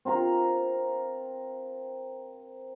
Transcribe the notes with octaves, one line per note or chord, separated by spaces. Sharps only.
C4 F4 A#4 A#5